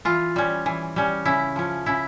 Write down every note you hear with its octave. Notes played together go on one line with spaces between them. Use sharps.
E3 F4
G3 C#4
E3
G3 C#4
C#3 E4
F3 C#4
C#3 E4